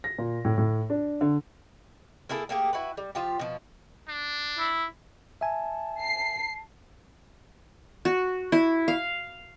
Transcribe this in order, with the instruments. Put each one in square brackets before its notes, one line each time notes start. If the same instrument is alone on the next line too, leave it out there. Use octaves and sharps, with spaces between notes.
[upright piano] A#6
A#2
A2
A2
D4
D3
[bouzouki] A#3 E4 G#4 A4
A3 A#3 G4 G#4
E4 F#4 B4
G3
F3 F4 G4
B2 F3
[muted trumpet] D4
[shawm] E4
[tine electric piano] E5 G#5 [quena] A5
[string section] C7
[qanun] F#4
E4
F5